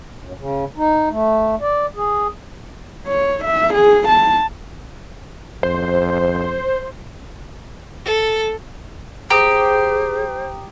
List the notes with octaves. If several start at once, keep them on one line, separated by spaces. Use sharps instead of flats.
F#2
C#3
D#4
A3
D5
G#4
C#5
E5
G#4
A5
F2 C5
A4
G4 G#4 C5 A#5 D#6